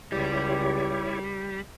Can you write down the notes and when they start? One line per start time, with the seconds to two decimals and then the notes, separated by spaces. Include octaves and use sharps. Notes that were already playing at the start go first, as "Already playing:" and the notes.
0.12 C#2 G3 E4 G4 C#5